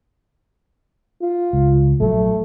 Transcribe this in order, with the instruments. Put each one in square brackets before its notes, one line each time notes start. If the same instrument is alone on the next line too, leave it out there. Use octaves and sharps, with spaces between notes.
[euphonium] F4
[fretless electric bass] C#2
[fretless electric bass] A#1 F#3 [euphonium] A3